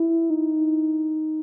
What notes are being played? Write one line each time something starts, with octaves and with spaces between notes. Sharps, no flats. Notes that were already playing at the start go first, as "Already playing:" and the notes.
Already playing: E4
D#4